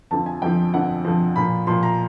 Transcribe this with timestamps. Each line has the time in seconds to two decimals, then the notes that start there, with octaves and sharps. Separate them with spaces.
0.11 F2 D3 F3 A5
0.26 G#5
0.42 F2 D3 F3 G5
0.74 F2 D3 F3 F#5
1.05 F2 D3 F3
1.36 A#2 F3 B5
1.67 A#2 F3 C6
1.83 A#5